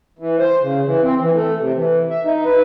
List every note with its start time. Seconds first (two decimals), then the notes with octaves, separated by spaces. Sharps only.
0.19 E3
0.39 C5
0.62 C#3
0.85 E3
1.03 C4
1.21 E3
1.33 A3
1.59 C3
1.76 E3
2.10 E5
2.25 D#4
2.45 B4